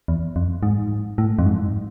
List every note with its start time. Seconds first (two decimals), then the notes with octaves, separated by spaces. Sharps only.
0.08 E2
0.36 F2
0.63 G#2
1.18 A2
1.39 F2
1.46 G#2